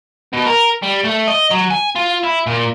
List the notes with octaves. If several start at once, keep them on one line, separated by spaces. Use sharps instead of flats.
B2
A#4
G3
A3
D#5
F#3
G#5
F4
E4
A#2